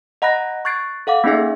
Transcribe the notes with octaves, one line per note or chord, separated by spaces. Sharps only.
D#5 F#5 A#5 B5 F#6 A#6
C#6 F#6 G#6 A6 C7 D7
A4 F5 F#5 D6
A#3 C#4 D#4 G#4 E5